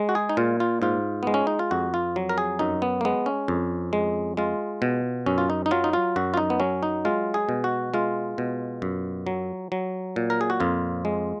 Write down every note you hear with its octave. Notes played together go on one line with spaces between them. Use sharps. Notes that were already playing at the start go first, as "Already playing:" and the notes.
Already playing: G#3
F#4
G#4
D#4
A#2 F4
F4
G#2 F4
G#3 B3
C#4
D#4
F4
F2 F#4
F4
F#3
A#4
G#4
F#2 D#4
B3
A#3
G#3 B3
C#4
F2
G#3
G#3 F4
B2
F#2 C#4
F4
D#4
D#4
F#3 F4
D#4
F4
F#2 F#4
F4
D#4
B3
F#3 C#4
D#4
G#3 F4
G#4
B2
F#4
G#3 F4
B2
F#2
F#3
F#3
A#2
A#4
G#4
F#4
F2 F4
G#3